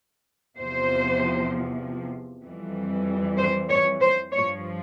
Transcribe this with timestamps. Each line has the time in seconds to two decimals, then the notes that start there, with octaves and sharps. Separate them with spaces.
0.58 E2 C3 F3 C5
2.44 F2 E3 G3
3.38 C5
3.69 C#5
4.01 C5
4.32 G2 F3 C#5